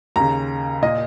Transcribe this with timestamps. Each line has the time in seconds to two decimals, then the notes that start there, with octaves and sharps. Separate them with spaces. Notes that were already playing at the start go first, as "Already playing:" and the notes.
0.16 D#2 C#3 A#5
0.82 A#2 D#5